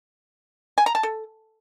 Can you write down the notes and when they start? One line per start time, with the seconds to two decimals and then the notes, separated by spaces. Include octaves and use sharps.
0.78 G#5
0.86 A#5
0.95 A5
1.03 A4